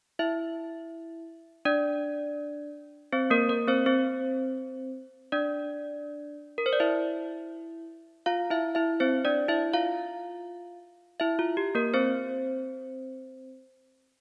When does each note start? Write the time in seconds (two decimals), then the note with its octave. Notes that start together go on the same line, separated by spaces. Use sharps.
0.19 E4 E5
1.65 D4 D5
3.12 C4 C5
3.30 A#3 A#4
3.49 A#3 A#4
3.68 C4 C5
3.86 C4 C5
5.32 D4 D5
6.58 A#4
6.66 C5
6.73 D5
6.80 E4 E5
8.26 F4 F5
8.50 E4 E5
8.75 E4 E5
9.00 C4 C5
9.25 D4 D5
9.48 E4 E5
9.74 F4 F5
11.20 E4 E5
11.39 F4
11.57 G4
11.75 A#3 A#4
11.94 C4 C5